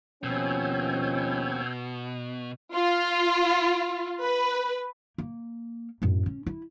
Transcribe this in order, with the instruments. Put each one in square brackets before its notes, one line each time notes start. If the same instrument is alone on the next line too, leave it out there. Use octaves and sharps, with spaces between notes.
[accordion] D#2 C4 [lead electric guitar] B2 [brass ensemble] F3 C#4 [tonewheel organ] E6 G6 G#6
[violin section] F4
B4
[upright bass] A#3
F#2 A2
C#4
E4